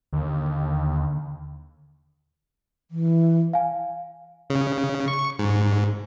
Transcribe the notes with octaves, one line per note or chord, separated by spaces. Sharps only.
D#2 D3
E3
F5 G#5
C#3
C#6
G#2